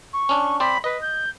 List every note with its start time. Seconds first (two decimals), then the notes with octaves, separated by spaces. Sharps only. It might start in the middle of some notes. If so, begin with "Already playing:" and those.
0.13 C#6
0.29 C#4 D4
0.60 C4 C5 D5 B5
0.84 B4 D#5
1.01 G6